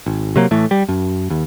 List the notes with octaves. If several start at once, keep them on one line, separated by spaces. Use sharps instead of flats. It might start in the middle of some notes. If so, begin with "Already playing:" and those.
G#1
C3 F#3 A#3
A2 E3 A3
G3
F#2
D#2